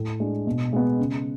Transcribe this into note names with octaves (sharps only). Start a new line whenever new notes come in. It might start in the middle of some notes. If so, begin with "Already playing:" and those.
Already playing: A2
G#3 D4
B2
G#3 B3
C#3